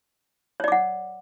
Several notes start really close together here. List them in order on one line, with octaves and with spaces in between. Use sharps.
C#5 D5 D6 F#5